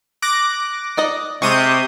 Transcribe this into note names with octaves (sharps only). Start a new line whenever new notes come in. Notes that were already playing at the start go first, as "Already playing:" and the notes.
D6 F#6 A#6
D#4 D5 D#5
C3 G#3 C#6 D#6 G6